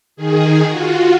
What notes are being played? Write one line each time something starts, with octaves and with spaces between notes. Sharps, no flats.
D#3 G#4
F4 F#4